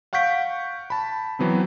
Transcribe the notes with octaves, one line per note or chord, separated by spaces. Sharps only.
F5 F#5 C#6 G6 B6 D7
A5 B5
E3 F#3 B3 C4